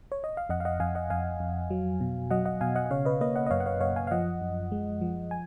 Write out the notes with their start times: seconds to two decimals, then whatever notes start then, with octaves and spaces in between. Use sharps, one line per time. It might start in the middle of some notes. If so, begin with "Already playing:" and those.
0.12 C#5
0.24 D#5
0.37 F5
0.49 F2 D#5 F#5
0.60 F5
0.65 D#5 F#5
0.80 F2 F5 G#5
0.95 D#5 F#5
1.10 F2 F5 G#5
1.40 F2
1.70 F#3
2.01 B2
2.31 F#3 D#5 F#5
2.45 D#5 F#5
2.61 B2 F5 G#5
2.75 D#5 F#5
2.86 D#5
2.90 C#3 C#5 F5
3.05 B4 D#5
3.21 A#3 B4 D#5
3.36 D#5 F#5
3.46 D#5
3.51 F#2 C#5 F5
3.60 F#5
3.66 C#5 F5
3.81 F#2 C#5 F5
3.96 F5 G#5
4.07 F5
4.11 F3 D#5 F#5
4.41 F#2
4.72 G#3
5.01 F3
5.31 G#5